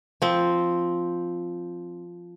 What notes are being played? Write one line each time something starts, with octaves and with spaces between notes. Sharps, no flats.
F3 C4